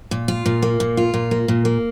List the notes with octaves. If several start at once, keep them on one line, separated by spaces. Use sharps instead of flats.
A#2
F4
A#2
A#3
A#2
F4
A#2
A#3
A#2
A#3